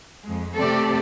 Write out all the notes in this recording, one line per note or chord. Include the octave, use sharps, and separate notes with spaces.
F2 G#3
C3 A3 C4 G4 A4 D5